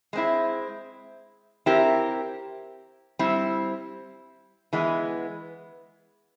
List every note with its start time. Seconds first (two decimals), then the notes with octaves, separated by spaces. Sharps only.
0.13 G#3 C4 E4
1.66 C4 E4 G4 A#4
3.19 G3 C4 E4
4.73 E3 G#3 B3